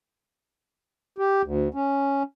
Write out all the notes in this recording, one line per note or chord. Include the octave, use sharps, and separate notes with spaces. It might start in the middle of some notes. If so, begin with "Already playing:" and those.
G4
D2
C#4